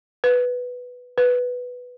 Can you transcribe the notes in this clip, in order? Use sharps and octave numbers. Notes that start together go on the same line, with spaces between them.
B4
B4